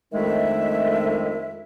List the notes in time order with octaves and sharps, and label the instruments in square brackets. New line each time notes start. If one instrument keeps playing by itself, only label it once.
[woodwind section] F2 D#3 G#3 A3 D4 E5